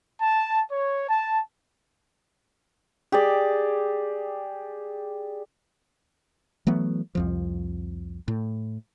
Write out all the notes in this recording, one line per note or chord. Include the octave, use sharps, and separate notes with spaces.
A5
C#5
A5
G4 G#4 D5
E3 F#3 A3 B3
C2 F2 F3
A2